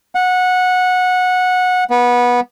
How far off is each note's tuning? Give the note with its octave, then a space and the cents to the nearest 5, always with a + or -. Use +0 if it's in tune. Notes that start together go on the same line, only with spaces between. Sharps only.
F#5 -15
B3 -20